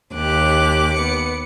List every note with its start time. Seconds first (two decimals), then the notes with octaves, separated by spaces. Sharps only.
0.14 D#2 G4 D6 F#6
0.94 B3 C#7